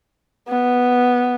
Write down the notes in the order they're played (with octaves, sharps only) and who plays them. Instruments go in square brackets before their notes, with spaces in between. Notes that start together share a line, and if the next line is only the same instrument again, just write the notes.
[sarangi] B3